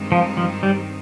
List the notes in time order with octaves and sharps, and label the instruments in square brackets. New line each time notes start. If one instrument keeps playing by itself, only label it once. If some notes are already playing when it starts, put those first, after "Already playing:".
Already playing: [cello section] G2 D#3 G#3 C4 D#4
[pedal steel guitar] F3
F3
G3